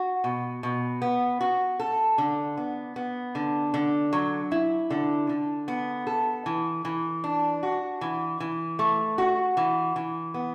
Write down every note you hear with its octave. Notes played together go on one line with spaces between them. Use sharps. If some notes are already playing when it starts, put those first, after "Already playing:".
Already playing: F#4
B2
B2
B3
F#4
A4
D3
B3
B3
D3
D3
F#3
E4
D3
D3
B3
A4
E3
E3
D4
F#4
E3
E3
A3
F#4
E3
E3
B3